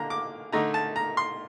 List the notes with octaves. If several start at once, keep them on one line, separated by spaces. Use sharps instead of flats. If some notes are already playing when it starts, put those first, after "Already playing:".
Already playing: D3 A#3 A#5
D6
D3 A3 D#4 A#5
A5
A#5
C6